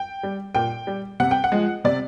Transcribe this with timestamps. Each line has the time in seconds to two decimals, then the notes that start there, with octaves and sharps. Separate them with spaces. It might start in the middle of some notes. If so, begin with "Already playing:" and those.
Already playing: G5
0.23 G3
0.55 A#2 G5
0.87 G3
1.20 C3 F#5
1.31 G5
1.44 F#5
1.52 F3 G#3
1.84 C3 D5